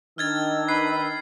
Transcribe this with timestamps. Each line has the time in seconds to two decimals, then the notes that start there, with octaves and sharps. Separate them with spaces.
0.18 D#3 D4 D#5 E6 F6 G#6 A6
0.69 B4 C7